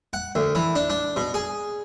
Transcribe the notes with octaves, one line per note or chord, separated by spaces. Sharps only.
F#5
D2
E3
D4
D4
B2
G#4